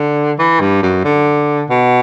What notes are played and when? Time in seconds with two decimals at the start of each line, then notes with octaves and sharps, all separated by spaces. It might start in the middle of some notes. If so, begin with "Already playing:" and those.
Already playing: D3
0.39 E3
0.60 G2
0.83 F#2
1.05 D3
1.70 B2